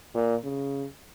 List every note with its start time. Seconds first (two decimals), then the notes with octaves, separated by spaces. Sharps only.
0.14 A#2
0.44 C#3